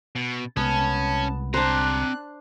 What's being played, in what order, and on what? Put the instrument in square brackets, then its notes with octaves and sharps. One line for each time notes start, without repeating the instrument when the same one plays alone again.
[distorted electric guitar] B2
[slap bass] C2 G#3 [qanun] B3 [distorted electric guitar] C#4 [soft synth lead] A5
[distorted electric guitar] C4 A#5 [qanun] D4 C5 [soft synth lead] F#6